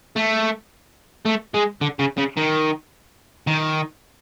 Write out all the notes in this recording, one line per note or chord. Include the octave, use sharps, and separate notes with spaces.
A3
A3
G#3
D3
C#3
C#3
D#3
D#3